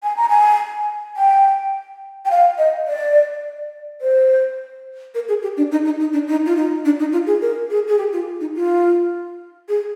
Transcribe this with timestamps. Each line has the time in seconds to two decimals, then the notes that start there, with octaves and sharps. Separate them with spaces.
0.03 G#5
0.17 A#5
0.29 G#5
1.17 G5
2.25 G5
2.31 F5
2.58 D#5
2.87 D5
4.01 C5
5.15 A#4
5.28 G#4
5.42 G4
5.57 D4
5.72 D#4
5.85 D#4
6.00 D#4
6.13 D4
6.28 D#4
6.46 F4
6.56 D#4
6.85 D4
6.99 D#4
7.12 F4
7.27 G#4
7.42 A#4
7.70 G#4
7.88 G#4
7.98 G4
8.13 F4
8.41 D#4
8.55 F4
9.68 G#4